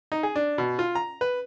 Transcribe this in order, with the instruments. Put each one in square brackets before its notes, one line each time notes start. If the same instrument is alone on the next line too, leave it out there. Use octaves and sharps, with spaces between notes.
[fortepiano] D#4
G#4
D4
B2
F4
A#5
B4